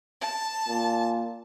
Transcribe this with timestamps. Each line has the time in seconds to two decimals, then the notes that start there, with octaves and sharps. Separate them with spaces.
0.19 A5
0.68 A#2